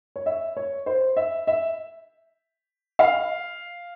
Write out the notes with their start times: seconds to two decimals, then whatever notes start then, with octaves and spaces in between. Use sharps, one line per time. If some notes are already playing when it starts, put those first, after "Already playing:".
0.16 C#5
0.26 E5
0.57 C#5
0.86 C5
1.16 E5
1.47 E5
2.99 F5